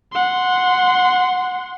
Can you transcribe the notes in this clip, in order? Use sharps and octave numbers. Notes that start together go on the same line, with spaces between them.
F#5 C6